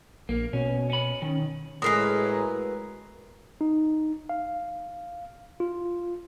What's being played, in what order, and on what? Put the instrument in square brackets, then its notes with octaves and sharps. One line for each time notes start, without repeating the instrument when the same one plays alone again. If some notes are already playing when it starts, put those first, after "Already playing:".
[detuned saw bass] A#1 [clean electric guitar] A#3
[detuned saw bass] B2 [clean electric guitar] C#4
[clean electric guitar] C#4 B5
[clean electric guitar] D#3 [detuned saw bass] C#4
[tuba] A2 [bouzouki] F#3 A#4 B4 [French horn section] G#3 [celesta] D#6 C7
[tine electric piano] D#4
F5
F4